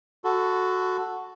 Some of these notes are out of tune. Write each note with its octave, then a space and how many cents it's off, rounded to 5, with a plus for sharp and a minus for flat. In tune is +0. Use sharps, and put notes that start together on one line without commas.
F#4 +0 A4 +0 B5 +45